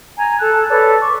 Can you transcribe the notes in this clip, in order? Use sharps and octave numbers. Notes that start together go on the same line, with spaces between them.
G#5 A#5 G#6
A4 A5 F#6
A4 B4 C#5 D5
C#6 D6